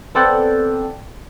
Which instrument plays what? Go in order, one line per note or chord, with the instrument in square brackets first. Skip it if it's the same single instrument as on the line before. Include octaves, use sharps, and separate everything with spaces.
[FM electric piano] B3 C4 A4 D5 F#5 G5